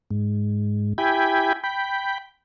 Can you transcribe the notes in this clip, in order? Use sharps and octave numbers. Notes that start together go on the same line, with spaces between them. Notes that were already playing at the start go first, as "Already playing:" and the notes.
G#2
E4 G4 G5 G#5 B5
G5 B5